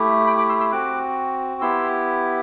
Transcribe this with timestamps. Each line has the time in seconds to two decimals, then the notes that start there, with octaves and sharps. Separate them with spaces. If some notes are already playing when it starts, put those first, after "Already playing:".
Already playing: A3 E4 G4
0.27 G5 B5
0.38 B5 D6
0.49 C6 E6
0.60 C6 E6
0.72 C4 F#4 D6 F#6
1.61 B3 E4 G4 C6 E6